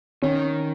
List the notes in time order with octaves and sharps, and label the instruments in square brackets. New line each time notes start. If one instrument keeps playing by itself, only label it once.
[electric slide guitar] D#3 [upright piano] C#4